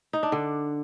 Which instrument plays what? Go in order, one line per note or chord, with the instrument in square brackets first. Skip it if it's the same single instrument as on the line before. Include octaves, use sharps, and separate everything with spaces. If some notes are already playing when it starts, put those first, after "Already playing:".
[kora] D#4
D4
D3